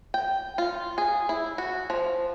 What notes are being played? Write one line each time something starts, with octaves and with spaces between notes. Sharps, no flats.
G5
F4
G#4
E4
F#4
F3